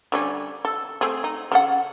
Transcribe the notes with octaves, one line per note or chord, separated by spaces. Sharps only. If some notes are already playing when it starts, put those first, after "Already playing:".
D3 G3 C#4
A4
A3 C4 G#4
D#4
C#3 A4 F#5